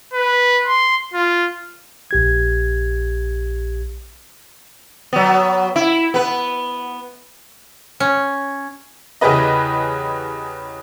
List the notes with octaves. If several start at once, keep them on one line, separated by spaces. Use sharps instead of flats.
B4
C6
F4
A#1 G4 G#6
F#3 B3
E4
B3 B4
C#4
E2 C#3 G4 G#4 B4 D#5